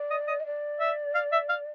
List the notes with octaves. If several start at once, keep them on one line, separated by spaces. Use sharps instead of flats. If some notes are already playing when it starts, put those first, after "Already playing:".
Already playing: D5
D#5
D#5
D#5
D5
E5
F5
E5
F5